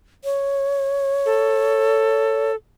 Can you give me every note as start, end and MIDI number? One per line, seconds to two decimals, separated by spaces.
0.24 2.51 73
1.25 2.55 69